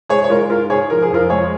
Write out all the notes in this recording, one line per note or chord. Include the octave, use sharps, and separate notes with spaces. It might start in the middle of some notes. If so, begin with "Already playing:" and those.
G#3 G#4 C#5
C#5
G#3 F4 A#4
G#2 F4 A#4
G#2 G#4 C#5
F3 A#4
G#4
F2 F4 A#4
G#3 G#4 C#5